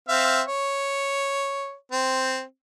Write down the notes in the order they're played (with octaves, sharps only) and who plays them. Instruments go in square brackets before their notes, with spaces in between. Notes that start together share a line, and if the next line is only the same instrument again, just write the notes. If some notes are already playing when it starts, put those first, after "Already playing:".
[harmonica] C4 E5 F5
C#5
C4